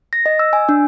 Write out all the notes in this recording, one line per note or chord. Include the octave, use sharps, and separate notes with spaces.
A#6
D#5
E6
G#5
D4